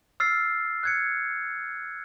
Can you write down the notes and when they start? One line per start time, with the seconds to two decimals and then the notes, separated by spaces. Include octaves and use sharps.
0.20 E6 F6 A6 C7
0.83 F#6 G#6 C#7